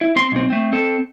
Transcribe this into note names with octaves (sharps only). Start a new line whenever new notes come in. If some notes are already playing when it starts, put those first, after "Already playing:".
E4
C4 C6
B1 C4
A3 C4
C4 A4